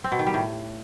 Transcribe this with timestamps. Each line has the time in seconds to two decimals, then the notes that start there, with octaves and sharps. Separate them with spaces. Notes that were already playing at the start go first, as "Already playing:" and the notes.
0.04 C4
0.12 B2
0.19 D#3
0.26 G3
0.34 A2